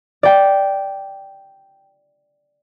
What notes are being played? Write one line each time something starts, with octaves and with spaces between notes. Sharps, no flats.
D5 G5